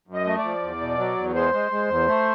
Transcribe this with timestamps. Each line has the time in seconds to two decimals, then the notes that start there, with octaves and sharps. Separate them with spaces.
0.08 F#2
0.14 D#5
0.26 A3
0.38 D5
0.44 F3
0.62 E2
0.81 B2
0.98 F#3
1.17 E2
1.35 G#3 C5
1.53 G#3
1.71 G#3
1.89 E2
2.07 A3